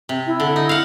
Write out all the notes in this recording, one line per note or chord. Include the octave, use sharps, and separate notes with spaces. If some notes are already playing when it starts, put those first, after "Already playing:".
C3
E4
D3
D#4
F5 F#5